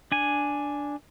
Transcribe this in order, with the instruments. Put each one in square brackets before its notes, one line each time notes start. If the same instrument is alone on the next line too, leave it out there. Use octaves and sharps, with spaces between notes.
[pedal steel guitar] D4 G#5